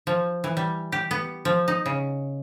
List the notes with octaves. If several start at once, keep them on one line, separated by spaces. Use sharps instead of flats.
F3
E3
G3
G4
B3
F3
D#4
C#3